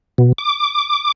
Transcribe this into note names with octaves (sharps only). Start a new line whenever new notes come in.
B2
D6